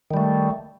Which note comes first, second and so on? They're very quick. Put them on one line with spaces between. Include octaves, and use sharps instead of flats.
D#3 G3 A3